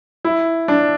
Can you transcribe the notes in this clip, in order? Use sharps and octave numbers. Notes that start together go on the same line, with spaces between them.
E4
D4